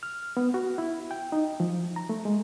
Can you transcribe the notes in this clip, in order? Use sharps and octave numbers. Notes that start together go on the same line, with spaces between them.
F6
B3
F#4
E4
G5
D#4
F3
A#5
A3
G#3